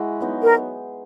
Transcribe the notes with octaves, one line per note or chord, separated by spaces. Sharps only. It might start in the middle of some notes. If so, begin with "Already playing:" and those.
Already playing: G#3 E4 F#4 G#4
F#3 B3 D#4
A#4